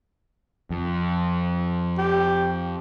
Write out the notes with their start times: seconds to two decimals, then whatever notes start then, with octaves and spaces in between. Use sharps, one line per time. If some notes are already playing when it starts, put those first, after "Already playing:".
0.70 F2
1.98 G4